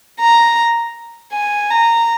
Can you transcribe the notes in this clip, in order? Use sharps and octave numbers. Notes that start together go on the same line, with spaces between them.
A#5
G#5
A#5